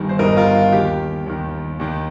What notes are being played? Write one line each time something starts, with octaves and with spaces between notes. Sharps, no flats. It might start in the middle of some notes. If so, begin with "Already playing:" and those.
Already playing: G1 G2 D#3
C5
G1 G2 D#3 A#4 D#5
F4 A#4
F4
D#2 D#3 G4
D#2 D#3
D#2 D#3